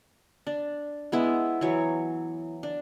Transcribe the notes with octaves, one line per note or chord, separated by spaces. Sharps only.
D4
G#3 B3 E4
E3 F#3 C#5
D4